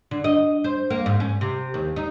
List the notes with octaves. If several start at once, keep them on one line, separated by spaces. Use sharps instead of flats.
D3
D#5
C5
A#3
G#2
C#4
C3
D#2
D#4